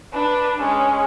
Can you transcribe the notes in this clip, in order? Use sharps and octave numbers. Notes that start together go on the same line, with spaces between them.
D4 B4
G#3 C#4